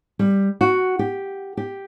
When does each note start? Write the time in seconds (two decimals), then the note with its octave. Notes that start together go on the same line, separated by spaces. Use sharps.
0.19 G3
0.61 F#4
0.99 G4
1.57 G4